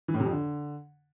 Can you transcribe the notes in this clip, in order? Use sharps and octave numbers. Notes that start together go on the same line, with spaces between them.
E3
A2
C3
F2
D3